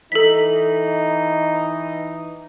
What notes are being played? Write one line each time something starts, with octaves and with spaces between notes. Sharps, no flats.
E3 D#4 A4 B6